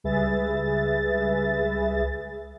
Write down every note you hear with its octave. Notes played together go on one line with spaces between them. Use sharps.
C#2 G3 G#4 B4 E5 A6